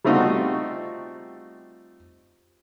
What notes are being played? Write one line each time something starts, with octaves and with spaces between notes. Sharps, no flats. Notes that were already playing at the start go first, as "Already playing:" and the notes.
G3 A3 C4 D#4 F4 F#4